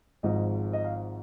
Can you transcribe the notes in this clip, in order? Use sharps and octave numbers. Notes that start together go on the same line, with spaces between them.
G#1 G#2 F3 D#5
D#5
F5